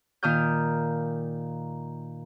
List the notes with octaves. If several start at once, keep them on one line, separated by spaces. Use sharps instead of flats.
A#2 D#3 D#6 F6 G6